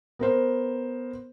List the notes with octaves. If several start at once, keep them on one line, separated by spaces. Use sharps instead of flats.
B3 A#4 C5